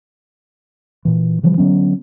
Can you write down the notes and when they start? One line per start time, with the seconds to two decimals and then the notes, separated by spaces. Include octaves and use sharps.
1.05 A#2 E3
1.43 C#3 E3 F3 G3
1.58 D3 F#3 B3 C#4